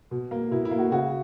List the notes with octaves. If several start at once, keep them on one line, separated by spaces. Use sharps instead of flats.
B2
A#3
B2 E4
E4
A#3
F#4
C#3 F#4